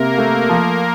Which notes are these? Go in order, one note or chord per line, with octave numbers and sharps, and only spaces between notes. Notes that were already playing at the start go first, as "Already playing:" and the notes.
Already playing: C3 A#3 A#4
A3
F3